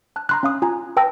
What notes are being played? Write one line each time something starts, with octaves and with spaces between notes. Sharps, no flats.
A5 F#6
A#5 C6 F#6
C#4 F5 D#6
F4 G#5 A#5
B4 G5 A5 E6 A#6